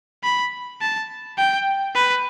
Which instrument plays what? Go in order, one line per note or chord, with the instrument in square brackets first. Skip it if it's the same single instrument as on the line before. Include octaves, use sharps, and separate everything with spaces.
[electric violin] B5
A5
G5
B4